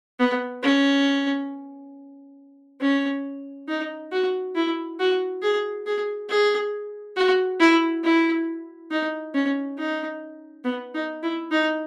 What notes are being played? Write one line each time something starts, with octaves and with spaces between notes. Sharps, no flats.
B3
C#4
C#4
D#4
F#4
E4
F#4
G#4
G#4
G#4
F#4
E4
E4
D#4
C#4
D#4
B3
D#4
E4
D#4